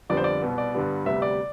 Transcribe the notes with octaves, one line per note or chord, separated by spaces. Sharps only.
F2 D3 G3 B3 D5
C5
D5
C2 B2 B3
D5
G2 D3 G3 B3
D2 C3 G3 B3 E5
D5